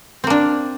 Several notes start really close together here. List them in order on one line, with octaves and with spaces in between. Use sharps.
C4 A#3 D4